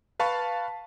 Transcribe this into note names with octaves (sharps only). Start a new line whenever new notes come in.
B4 F5 A5 B5 C#6